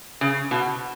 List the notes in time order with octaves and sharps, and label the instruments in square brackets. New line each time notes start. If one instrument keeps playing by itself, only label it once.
[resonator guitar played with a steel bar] C#3
B2